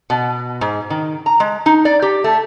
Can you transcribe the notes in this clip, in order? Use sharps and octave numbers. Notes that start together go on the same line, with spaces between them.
B2
G#2
D#3
A#5
G#3
D#4
D5
G4
A3